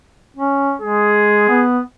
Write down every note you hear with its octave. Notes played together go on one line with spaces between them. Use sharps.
C#4
G#3 G#4
B3